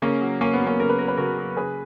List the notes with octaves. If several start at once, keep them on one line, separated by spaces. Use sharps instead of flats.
C#3 A#3 C#4
F#3
C#3 A#3 C#4
B3
F#3
A#3 C#4
C#3 A#4
B4
F#3 A#4
B4
C#3 F#4 A#4
F#3
C#3 G#4 B4